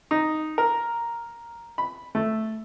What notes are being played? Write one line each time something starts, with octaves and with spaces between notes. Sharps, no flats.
D#4
A#4
B5
A3